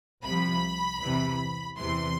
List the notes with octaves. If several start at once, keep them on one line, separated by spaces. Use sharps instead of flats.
C2 C3 F3 B5
E2 C3 E3
E2 C3 E3 C6